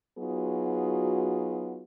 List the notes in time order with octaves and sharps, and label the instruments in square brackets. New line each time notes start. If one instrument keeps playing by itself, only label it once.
[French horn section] F#3 B3 D#4 F4 F#4 G#4